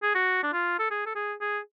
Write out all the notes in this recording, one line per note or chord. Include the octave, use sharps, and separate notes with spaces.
G#4
F#4
D4
F4
A4
G#4
A4
G#4
G#4